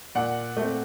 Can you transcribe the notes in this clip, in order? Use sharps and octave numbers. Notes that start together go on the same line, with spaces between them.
A#2 D5 F#5
A3 C4